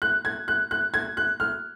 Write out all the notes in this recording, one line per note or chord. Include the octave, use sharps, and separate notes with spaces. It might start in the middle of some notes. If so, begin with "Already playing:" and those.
F#6
G#6
F#6
F#6
G#6
F#6
F6